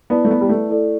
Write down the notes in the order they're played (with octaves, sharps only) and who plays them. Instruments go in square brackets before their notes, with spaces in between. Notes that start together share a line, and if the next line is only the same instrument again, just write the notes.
[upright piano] B3 [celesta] E4 B4 D5 A5
[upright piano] A3
B3
G3
A3
[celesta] E4 A4 D5